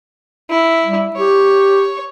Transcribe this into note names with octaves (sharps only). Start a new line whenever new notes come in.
E4
G3
G4 C#5